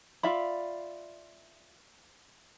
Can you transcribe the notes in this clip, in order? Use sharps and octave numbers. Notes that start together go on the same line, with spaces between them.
F4 D5 E5 B5